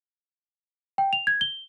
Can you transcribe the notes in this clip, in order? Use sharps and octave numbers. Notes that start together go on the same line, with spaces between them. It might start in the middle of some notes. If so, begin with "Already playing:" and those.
G5
F7
G#6
G7